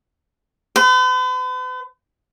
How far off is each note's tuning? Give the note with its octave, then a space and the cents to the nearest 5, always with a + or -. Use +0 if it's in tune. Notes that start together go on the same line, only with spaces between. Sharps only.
B4 +45